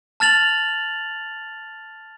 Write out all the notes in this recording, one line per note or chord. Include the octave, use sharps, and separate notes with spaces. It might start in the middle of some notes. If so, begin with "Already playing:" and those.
A5 F6 A6 F7 F#7